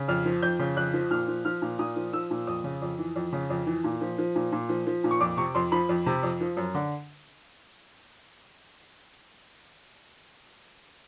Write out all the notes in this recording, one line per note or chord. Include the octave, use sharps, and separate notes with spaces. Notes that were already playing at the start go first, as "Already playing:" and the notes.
Already playing: C#3
F2 F6
F3
F2 G6
C#3
F2 F#6
F3
A#2 F6
F3
F3 F6
A#2
A#2 D#6
F3
F3 E6
A#2
F2 D#6
C#3
F2
E3
F2
C#3
F2
E3
A#2
F3
F3
A#2
A#2
F3
F3
A#2
C#6
F2 D6
C3 C#6
F2 C6
F3 B5
F2
C3
F2
F3
F#2
D3